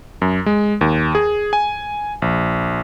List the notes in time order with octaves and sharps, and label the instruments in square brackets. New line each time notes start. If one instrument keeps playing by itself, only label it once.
[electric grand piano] F#2
G#3
D#2
G#4
G#5
A#1